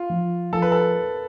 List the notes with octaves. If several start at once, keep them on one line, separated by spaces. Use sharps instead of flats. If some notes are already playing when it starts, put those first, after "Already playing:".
Already playing: F4
F3
F3 A4
B4
A4